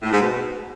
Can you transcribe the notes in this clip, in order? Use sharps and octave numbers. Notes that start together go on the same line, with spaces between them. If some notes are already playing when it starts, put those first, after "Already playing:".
A2
G#2
B2